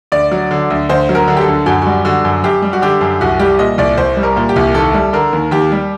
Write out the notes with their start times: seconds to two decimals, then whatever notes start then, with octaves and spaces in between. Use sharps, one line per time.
0.12 D2 D5
0.32 F#3
0.51 D3
0.70 D2
0.89 D2 C5
1.09 F#3
1.15 A#4
1.28 D3
1.37 G4
1.41 A4
1.48 D2
1.66 F#2 F#4
1.82 G3 F#4
2.05 D3 F#4
2.24 F#2
2.43 F#2 G4
2.62 G3
2.73 F#4
2.82 D3 G4
3.01 F#2
3.21 C2 F#4
3.39 G3 G4
3.59 A#2 D#5
3.78 C2 D5
3.97 C2 C5
4.17 G3
4.23 A#4
4.37 A#2
4.49 G4
4.56 C2
4.74 D#2 A4
4.94 G3
5.13 D3 A#4
5.33 D#2
5.51 D#2 G4
5.72 G3